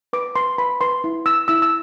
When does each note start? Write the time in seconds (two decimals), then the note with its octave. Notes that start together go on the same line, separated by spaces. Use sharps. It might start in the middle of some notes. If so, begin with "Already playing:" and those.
0.13 B4 D6
0.36 B4 C6
0.58 B4 B5
0.81 B4 C6
1.04 E4
1.26 E4 E6
1.48 E4 E6
1.62 E6